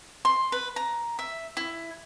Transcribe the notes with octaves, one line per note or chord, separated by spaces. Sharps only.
C6
B4
A#5
E5
E4